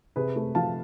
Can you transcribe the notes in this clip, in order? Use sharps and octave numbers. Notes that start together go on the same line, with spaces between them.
C3 G#4 B4
A3
F3 F5 A5